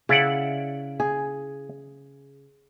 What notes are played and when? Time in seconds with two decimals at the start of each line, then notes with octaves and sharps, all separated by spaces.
0.09 C#3 E4 D5 F#5
1.00 G#4